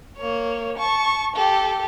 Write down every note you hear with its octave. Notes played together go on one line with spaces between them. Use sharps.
A#3 C#5
A5 C#6
G4 A4